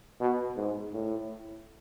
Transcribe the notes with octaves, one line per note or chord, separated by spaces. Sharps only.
B2
G#2
A2